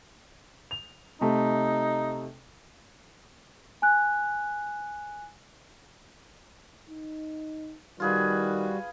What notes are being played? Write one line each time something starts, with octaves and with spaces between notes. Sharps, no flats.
F7
C3 A3 D#4
G#5 F#6
D#4
D#3 G3 F4 F#4 G#4 B4